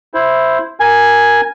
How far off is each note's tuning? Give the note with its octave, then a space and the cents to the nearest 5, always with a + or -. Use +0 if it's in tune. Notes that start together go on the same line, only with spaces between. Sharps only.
E4 +0 C5 +0
A#4 +0 G#5 +0